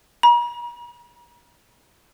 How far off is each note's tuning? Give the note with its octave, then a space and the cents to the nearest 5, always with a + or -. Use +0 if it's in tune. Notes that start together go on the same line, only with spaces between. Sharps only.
A#5 +45